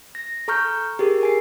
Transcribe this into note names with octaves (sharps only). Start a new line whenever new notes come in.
A#6
A4 A#5 C#6 F6 G6
G4 G#4 A#4
A#4 G#5 C7